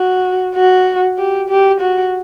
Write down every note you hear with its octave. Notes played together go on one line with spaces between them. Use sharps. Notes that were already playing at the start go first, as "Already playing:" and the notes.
Already playing: F#4
F#4
G4
G4
F#4